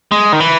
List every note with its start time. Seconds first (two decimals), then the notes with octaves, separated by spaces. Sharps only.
0.12 G#3
0.33 D#3
0.40 E3